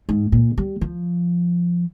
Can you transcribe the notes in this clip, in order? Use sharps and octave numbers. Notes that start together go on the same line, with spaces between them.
G#2
A#2
G3
F3